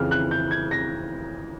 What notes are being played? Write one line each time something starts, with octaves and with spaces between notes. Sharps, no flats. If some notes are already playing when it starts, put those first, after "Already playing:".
Already playing: F2 C#3 E3 F6
F#6
G6
G#6
A#6